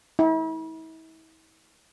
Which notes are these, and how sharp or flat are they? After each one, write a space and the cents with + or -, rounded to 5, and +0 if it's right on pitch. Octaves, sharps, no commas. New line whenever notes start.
E4 -40